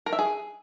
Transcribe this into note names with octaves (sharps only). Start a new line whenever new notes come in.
A#4
E5
G#4